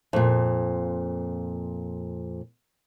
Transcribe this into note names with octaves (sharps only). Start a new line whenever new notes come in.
F2 A#2